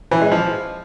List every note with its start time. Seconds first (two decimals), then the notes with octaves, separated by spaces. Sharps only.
0.11 E3
0.22 G#3
0.32 F3